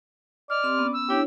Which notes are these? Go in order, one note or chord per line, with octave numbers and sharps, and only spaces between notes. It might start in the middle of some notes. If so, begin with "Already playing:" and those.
D5 D#5 F6
C4 G4 C6
B3 C#4
E6
D4 E4 G4 C#5